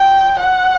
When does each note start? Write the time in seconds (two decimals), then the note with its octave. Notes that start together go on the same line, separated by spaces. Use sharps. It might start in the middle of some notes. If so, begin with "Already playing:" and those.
Already playing: G5
0.39 F#5